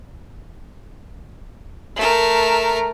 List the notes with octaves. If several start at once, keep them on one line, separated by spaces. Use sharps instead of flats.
A3 A#4